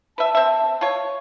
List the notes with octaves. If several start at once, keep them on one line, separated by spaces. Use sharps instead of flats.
B4 E5 A5
C4 E5
F4 C#5